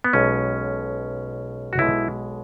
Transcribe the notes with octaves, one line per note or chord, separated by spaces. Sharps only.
B3
B1 B2 G#3 C#4
F#4
B1 B2 G#3 E4